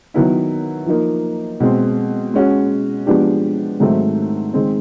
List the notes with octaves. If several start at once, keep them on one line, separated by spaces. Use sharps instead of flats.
D#3 F#3 B3 E4
F3 A#3 D#4
B2 G#3 C4
G#3 C#4 F#4
F3 G#3 B3 D4 G4
G#2 D#3 F#3 A3 C4
D#3 G#3 C4